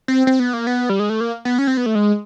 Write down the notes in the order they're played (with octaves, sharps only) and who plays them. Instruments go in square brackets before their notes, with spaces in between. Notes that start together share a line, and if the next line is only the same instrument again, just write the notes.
[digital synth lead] C4
C4
B3
A#3
B3
G3
G#3
A3
A#3
B3
C#4
C4
B3
A3
G#3